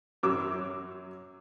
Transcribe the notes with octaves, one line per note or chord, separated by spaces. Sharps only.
F#2 F#3 D6 E6